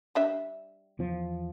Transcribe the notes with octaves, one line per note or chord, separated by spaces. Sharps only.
G3 D4 E5
E2 F3